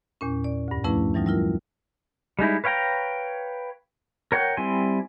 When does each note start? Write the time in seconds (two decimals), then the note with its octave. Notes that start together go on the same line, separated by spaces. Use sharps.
0.21 E2 A#2 C#4
0.44 D5
0.68 D2 G2
0.84 F3 A3 C#4 D4 E4 B4
1.14 E3 F#3 G3 D#4 F4
1.26 G3 E4 F4 A#4
2.39 G3 G#3 D#4 E4
2.64 B4 C#5 F5 G5 A#5
4.32 A#4 C#5 F#5 G5
4.57 G3 C4 E4 G#5 C6